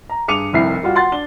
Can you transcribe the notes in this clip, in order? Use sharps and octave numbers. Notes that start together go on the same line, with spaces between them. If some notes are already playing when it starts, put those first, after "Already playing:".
A#5
G2 G#4 D6 C#7 D#7 F7
F1 C2 E4 C7
G3 F4 F#4
F#5 C6 A6
D4 G7